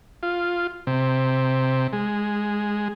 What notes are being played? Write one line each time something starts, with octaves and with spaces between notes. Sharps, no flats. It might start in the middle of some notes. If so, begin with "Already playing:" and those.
F4
C3
G#3